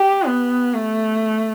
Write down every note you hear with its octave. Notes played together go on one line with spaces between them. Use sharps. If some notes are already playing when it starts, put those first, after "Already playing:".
Already playing: G4
B3
A3